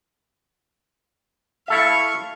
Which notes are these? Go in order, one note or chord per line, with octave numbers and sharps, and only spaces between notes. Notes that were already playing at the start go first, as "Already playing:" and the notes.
E4 A4 E5 F5 C#6